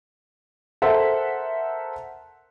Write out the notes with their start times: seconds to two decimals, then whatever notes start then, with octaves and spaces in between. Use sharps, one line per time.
0.82 A4 A#4 C5 E5 F#5